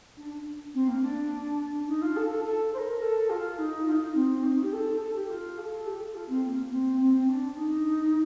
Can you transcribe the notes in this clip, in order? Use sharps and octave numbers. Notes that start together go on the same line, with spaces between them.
D4
C4
A#3
D4
D#4
F4
A4
A4
A4
C5
A#4
A4
F4
D#4
F4
D#4
C4
D#4
D#4
G4
A4
A4
G4
F4
A4
G4
A4
F4
C4
C4
A#3
C4
C4
D4
D#4